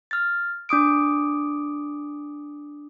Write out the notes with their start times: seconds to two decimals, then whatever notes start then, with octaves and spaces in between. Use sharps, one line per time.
0.11 F6 A6
0.69 D4 D6 D#6 D7